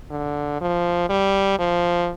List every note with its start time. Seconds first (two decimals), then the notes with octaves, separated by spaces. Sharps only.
0.11 D3
0.61 F3
1.09 G3
1.59 F3